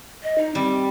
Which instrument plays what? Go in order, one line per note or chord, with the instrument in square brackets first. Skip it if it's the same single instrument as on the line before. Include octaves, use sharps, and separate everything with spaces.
[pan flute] D#5
D#4
[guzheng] G3 [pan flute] C4